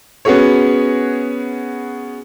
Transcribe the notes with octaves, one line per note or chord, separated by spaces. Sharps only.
B3 C#4 F#4 G#4 C#5